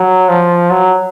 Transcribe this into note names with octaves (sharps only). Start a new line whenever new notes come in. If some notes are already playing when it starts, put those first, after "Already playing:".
Already playing: F#3
F3
F#3